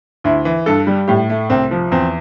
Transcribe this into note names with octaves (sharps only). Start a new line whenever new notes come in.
D2 E4
E3
G2 A4
G3
A2 G4
A3
C2 C4
F3
E2 C4